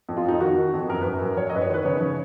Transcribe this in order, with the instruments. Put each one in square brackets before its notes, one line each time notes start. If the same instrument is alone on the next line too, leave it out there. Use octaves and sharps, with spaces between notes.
[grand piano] F2
F4
F2 D#4
D#3 F#4
D#3
F2
F#2 A#4
B4
F#2
F#2 A#4
F#2 C#5
D#5
F#2 B4
C#5
D#3 B4
C#3 C#5
C#3